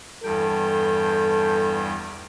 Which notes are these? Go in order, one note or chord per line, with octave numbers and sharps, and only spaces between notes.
E2 G2 A4 G5